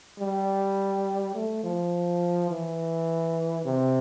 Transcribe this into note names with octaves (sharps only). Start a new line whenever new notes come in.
G3
A3
F3
E3
C3